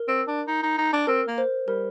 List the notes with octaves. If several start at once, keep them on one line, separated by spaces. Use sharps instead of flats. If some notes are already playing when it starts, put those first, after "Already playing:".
Already playing: A#4
C4
D4
D#4
D#4
D#4
D4
C4 A#4
A#3
C5
G3 A#4